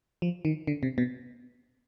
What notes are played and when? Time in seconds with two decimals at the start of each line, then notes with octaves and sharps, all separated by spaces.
0.22 F3
0.45 D#3
0.67 D3
0.83 C3
0.98 B2